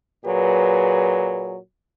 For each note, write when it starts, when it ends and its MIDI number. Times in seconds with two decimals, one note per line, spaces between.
0.25 1.56 46
0.25 1.56 54
0.25 1.56 68
0.25 1.56 71